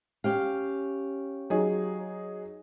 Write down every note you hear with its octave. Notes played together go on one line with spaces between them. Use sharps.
C#4 G4 F5
F#3 D#4 G#4